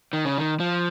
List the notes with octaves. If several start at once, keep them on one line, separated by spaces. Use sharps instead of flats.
D#3
C#3
D#3
F3